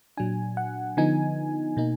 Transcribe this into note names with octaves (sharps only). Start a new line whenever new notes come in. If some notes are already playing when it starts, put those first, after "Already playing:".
A#2 F#3 D4 G#5
F#5
D3 F3 B3 D#4 G#5
B2 A#3 D#4